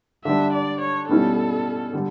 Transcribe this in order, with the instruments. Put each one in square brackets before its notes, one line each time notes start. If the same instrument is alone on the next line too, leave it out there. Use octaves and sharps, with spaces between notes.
[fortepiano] D3 G3 D4 [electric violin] E5
[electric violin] D5
C#5
[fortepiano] B2 G3 C#4 E4 [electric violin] A4
[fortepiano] D3 G3